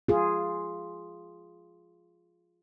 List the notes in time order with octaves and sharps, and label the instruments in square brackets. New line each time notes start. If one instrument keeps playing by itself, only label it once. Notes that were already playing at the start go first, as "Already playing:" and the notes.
[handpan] F4 G#4